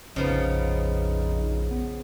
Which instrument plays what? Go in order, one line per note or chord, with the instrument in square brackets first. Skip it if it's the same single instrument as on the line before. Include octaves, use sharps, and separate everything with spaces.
[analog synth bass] A#1 [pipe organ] F2 D#4 [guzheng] C#3 F3 B3
[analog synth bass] B3